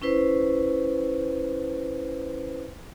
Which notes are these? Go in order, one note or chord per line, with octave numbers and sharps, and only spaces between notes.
C#4 E4 B4 C5